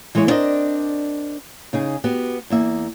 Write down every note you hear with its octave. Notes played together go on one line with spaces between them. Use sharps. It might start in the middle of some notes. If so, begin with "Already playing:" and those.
E3 G#3 G#4 C#5 E5
B3 C4 D4 A#4 D5 D#5
C#3 D#4 G#4
B3 F#4 G4
E2 A#3 E5